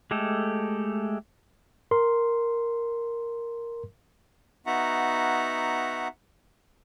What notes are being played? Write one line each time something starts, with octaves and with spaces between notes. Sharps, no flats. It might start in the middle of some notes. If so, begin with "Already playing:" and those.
G#3 A3 G4 A4
A#4 C6
B3 D#4 F#4 E5 F#5 A#5